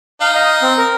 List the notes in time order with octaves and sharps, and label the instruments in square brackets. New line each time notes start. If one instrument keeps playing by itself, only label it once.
[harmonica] D#4 [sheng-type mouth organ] F5
[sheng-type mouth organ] D#5 F5
C4
A#4